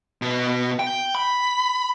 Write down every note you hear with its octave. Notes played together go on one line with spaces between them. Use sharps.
B2
G5
B5